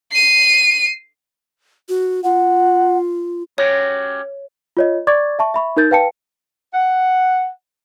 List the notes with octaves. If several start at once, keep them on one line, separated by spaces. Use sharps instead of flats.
C7 D#7
F#4
F4 F#5
C#4 F#4 G4 C#5
F4 C#5 D#5
D5 C#6 D6 G#6 A6
E5 A5 C#6
E5 B5 C#6
D#4 A#4 G6 A6
B4 F5 G5 A5 C#7
F#5